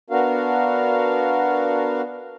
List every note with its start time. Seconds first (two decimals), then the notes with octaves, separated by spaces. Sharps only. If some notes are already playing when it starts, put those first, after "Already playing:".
0.10 B3 D4 F#4 A#4 F5